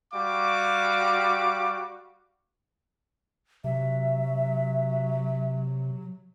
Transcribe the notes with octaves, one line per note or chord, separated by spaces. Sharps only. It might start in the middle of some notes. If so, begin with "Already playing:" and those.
G3 F#4 F5 D6
C3 F#3 E5